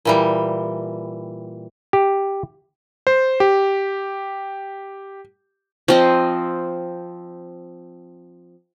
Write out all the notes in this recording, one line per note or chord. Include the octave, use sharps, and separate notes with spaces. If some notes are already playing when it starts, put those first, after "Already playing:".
A#2 E3 G3
G4
C5
G4
F3 C4 D#5